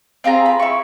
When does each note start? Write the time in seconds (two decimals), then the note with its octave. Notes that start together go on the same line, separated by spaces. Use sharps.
0.24 C4 F4 G#4 A#5
0.46 B5
0.59 E4 C#6